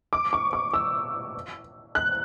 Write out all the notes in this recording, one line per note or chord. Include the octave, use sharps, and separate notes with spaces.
D6
C#6
D6
E6
F#6